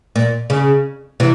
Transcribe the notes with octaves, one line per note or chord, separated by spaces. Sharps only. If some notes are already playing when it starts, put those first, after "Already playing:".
A#2
C#3
C3 E3